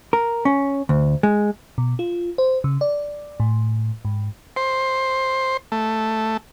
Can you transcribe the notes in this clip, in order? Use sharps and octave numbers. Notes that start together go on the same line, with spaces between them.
A#4
C#4
D2
G#3
B2
F4
C5
C#3
D5
A2
G#2
C5
A3